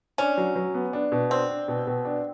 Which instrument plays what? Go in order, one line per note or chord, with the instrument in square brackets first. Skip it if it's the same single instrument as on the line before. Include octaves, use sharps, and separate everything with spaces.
[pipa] C#4 [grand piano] D4
[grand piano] F#3
F#3
B3
D4
B2
[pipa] C4 [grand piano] D4
[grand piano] D4
B2
B2
D4